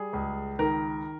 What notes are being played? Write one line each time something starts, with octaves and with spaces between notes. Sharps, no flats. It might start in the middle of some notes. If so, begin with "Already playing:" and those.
Already playing: G3 G#4
C#2
D#3 A#4